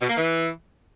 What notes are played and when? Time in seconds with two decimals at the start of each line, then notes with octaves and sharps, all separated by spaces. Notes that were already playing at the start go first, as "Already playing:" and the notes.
0.01 B2
0.09 A#3
0.17 E3